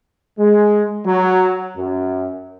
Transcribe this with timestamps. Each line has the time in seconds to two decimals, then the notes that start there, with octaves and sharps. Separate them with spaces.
0.39 G#3
1.06 F#3
1.76 F#2